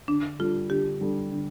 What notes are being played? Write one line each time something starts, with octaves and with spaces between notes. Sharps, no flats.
D3 D4
G3 D4 F4 A4
D3 G4
G3 D4 A4
D3